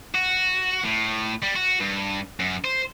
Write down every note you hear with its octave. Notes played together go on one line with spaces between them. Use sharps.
F#4
A2
G3
F#4
G2
F#2
C5